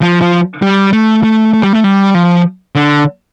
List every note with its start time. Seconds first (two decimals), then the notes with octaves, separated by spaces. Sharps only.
0.02 F3
0.21 F3
0.62 G3
0.93 A3
1.23 A3
1.53 A3
1.63 G3
1.73 A3
1.84 G3
2.15 F3
2.75 D3